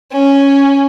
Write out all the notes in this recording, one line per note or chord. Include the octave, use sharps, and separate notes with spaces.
C#4